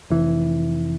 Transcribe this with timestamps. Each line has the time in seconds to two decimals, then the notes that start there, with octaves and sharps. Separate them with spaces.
0.10 F1 E3